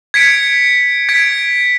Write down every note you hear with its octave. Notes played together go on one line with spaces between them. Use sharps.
G#6 B6 C#7 D7
G#6 B6 D7